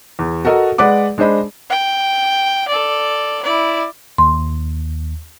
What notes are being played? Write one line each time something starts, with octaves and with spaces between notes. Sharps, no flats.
E2
F#4 A4 A#4 D#5 F#5
G#3 B4 D5 F#5 D6
G#3 D4 C5 D#5 B5
G5
A4 D5
E4 D5
D#2 C6